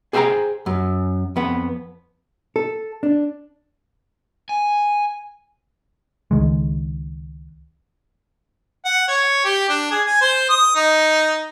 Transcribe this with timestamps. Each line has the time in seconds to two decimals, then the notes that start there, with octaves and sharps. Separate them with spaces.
0.13 G#4 C5 C#5 E5 G5 A#5
0.66 F#2
1.36 F2 B3
2.56 A4
3.03 D4
4.49 G#5
6.31 C#2 D#3 G#3
8.85 F#5
9.08 C#5
9.45 G4
9.69 D4
9.91 G#4
10.07 G#5
10.21 C5
10.50 D#6
10.76 D#4